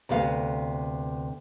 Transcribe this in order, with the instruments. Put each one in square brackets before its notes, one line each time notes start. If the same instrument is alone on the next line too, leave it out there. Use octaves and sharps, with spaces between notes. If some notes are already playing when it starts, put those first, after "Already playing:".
[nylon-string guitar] D2 C3 B3 F5